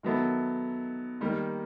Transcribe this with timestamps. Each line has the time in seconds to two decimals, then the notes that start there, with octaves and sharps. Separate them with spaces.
0.03 D#3 F#3 B3 E4 A4
1.21 D#3 G3 A#3